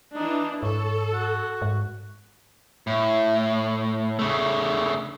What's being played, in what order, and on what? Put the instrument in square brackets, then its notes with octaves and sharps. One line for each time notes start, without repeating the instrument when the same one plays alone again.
[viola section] E3 D4 [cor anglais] D#4
[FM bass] G#2 [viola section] A4 [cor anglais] C#5
[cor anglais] F#4
[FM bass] G#2
[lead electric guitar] A2
C#3 A3